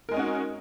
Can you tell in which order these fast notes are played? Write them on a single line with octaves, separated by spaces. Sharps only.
A#4 G#3 D#4 C#4 F#4